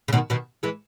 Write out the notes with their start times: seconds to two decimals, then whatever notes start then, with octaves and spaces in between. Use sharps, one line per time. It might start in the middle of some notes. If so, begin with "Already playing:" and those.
0.08 C#3
0.13 B2 D#3
0.30 B2 D#3
0.63 E3 G#3